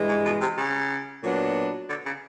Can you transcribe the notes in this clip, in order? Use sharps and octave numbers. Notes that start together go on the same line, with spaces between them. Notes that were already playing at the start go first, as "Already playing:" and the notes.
Already playing: G2 E3 G#3
G#2
B2
C3
C#3
A#2 F#3 B3 D4
D3
C#3